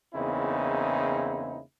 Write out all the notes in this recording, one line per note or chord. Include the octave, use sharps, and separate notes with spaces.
E2 C#3 A#3 C4 D#4 E4